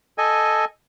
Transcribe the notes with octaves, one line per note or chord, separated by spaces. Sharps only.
A4 D#5 G#5